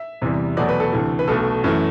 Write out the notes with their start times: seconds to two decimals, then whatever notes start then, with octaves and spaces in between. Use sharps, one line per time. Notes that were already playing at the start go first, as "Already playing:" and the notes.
Already playing: E5
0.22 E2 C3 E3 G3
0.57 E2 B2 F#3 A3 D5
0.69 B4
0.80 A4
0.92 D2 C3 E3 A3
1.19 B4
1.28 B1 B2 A3 A4
1.64 F#2 E3 A3